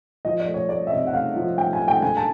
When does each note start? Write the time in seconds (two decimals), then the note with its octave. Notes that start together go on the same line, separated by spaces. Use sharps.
0.25 F3 D#5
0.40 D5
0.47 A3
0.54 C#5
0.69 A3 D5
0.87 E5
0.91 C3 D#5
1.07 F#5
1.14 A3 F5
1.36 F3
1.57 A3 G5
1.73 G#5
1.80 A3
1.88 G5
2.02 D3 G#5
2.17 A5